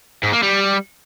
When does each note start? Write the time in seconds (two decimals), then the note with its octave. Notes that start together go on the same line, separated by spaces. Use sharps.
0.23 G#2
0.33 A#3
0.43 G3